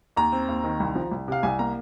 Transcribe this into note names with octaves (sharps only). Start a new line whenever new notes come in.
D#2 A#5
C4
D#2
D#3
C2
F3
C2
C3 F5
C2 G#5
A#3 A#5